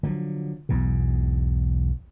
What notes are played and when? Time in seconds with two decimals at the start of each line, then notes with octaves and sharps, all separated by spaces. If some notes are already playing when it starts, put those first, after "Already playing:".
0.03 D3 F3 F#3
0.69 B1 E2 G#2 B2